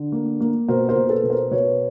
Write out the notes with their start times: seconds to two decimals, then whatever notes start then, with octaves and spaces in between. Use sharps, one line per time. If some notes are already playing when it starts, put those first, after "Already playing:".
Already playing: D3
0.12 A#3
0.40 A#3
0.68 B2 A#4 C5
0.89 A#4 C5
0.96 B2
1.09 A4 B4
1.23 B2
1.30 A#4 C5
1.51 B2 B4 C#5